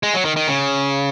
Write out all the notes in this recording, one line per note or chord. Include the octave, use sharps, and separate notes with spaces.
G#3
F#3
D#3
D#3
C#3